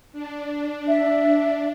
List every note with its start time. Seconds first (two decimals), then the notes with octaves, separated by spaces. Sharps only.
0.12 D4
0.88 E5